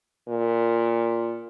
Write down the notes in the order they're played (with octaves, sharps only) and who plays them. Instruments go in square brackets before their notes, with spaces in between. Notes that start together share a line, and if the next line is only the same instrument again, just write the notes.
[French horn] A#2